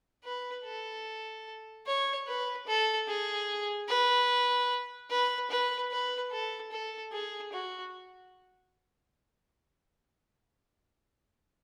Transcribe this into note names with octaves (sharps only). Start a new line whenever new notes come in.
B4
A4
C#5
B4
A4
G#4
B4
B4
B4
B4
A4
A4
G#4
F#4